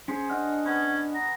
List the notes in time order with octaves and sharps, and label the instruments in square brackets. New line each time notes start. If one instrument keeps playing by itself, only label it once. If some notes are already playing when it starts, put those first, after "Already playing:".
[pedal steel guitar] C#4 [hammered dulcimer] G#4 C5
[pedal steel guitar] D4 D#5 F6 [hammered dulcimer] F#5
[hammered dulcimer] B3 [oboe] C#4
[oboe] A#5